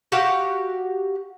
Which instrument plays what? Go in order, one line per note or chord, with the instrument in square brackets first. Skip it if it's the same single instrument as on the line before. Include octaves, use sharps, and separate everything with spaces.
[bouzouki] F#4 G4 F5 F#5